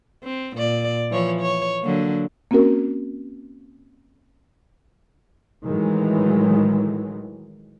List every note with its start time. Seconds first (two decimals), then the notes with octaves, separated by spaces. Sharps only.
0.24 C4
0.57 A#2 D5
1.11 E3 F3 C#5
1.41 C#5
1.82 D3 F#3 A#3
2.51 A#3 C4 C#4 F#4 A#4
5.64 A2 D#3 E3 F#3 G#3